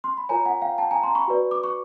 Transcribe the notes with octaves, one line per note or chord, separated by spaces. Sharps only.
C6
B5
F4 A#4 C#5 G#5 A#5
F#5 G#5
F5 G5
G5 A5
G#5 A#5
A#5 C6
B5 C#6
F#4 B4 D5
D6
C#6